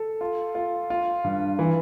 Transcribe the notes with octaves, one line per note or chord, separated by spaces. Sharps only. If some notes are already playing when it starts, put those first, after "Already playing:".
Already playing: A4
F4
F4
F4
G2
E3